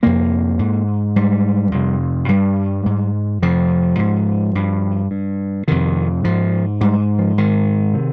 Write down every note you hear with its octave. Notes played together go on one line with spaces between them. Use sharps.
F2 C3 A#3
G#2
G#2 G3
F2 C3
G2 G3
G#2
F2 C3 F3
G#2
G2
G2
F2 C3 D#3
G#2 F3
G#2 G3
F3
G#2 D#3
C3